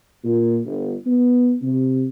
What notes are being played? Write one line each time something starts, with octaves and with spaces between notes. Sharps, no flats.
A#2
G1
B3
C3